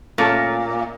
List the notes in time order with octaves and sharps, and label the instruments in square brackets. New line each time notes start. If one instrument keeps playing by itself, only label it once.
[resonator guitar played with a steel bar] A#2 [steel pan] A3 C#4 A4